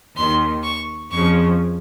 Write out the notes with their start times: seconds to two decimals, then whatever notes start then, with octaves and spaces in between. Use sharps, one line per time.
0.17 D#2 D#3 C6
0.64 C#6
1.12 F2 C#3 F3 C#6